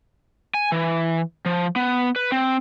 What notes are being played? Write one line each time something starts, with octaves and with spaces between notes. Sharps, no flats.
G#5
E3
F3
B3
B4
C4